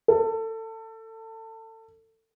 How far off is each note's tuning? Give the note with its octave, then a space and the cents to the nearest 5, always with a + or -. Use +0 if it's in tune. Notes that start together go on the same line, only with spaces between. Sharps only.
A4 +25